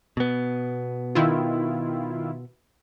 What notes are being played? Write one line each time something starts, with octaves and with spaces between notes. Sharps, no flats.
B2 B3
D#3 E4 F4